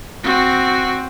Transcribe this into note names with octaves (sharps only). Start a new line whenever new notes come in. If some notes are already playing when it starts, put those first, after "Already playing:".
C4 F#4